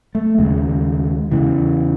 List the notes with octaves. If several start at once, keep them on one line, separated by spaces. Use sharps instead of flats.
A3
D#2 C#3 G#3
E2 C#3 E3